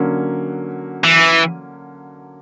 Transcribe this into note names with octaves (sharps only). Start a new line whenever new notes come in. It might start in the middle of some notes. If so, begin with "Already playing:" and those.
Already playing: D3 F#3 A#3 C#4
E3